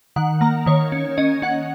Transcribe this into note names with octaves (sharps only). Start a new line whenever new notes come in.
D#3 F#5
A#3 A#5
D#3 C#5
C#4
C#4 D#5
C#4 F#5